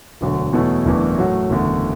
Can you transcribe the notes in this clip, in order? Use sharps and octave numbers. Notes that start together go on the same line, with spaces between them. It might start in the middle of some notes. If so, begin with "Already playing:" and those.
E1 D2 D3 F#3
E2 B2 F#3 A3 E4
F#1 E2 E3 A3 D4
A2 F#3 A3 F#4
F#1 E2 D3 A3